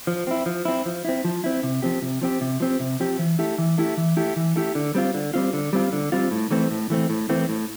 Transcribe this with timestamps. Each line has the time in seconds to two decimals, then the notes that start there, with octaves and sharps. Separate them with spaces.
0.07 F3
0.27 C4 E4
0.46 F3
0.65 C4 E4
0.86 F3
1.05 C4 E4
1.25 F3
1.44 C4 E4
1.63 C3
1.82 F3 C4 G4
2.02 C3
2.21 F3 C4 G4
2.41 C3
2.60 F3 C4 G4
2.80 C3
3.00 F3 C4 G4
3.19 E3
3.39 A3 E4 G4
3.58 E3
3.78 A3 E4 G4
3.97 E3
4.17 A3 E4 G4
4.36 E3
4.56 A3 E4 G4
4.75 D3
4.95 G3 C4 F4
5.14 D3
5.34 G3 C4 F4
5.53 D3
5.73 G3 C4 F4
5.93 D3
6.12 G3 C4 F4
6.31 A2
6.51 E3 A3 C4
6.71 A2
6.90 E3 A3 C4
7.10 A2
7.29 E3 A3 C4
7.49 A2